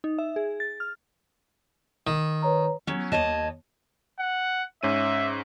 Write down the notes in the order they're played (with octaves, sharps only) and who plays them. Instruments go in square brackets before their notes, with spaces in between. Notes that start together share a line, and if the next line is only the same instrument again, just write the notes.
[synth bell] D#4
E5
G#4
A6
F6
[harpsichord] D#3
[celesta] B4 C#5 A#5
[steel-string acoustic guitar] F#3 C#4
D#2 G#2 C#5 D#5 A5
[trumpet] F#5
[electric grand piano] G#2 C#4 D#7 [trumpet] E5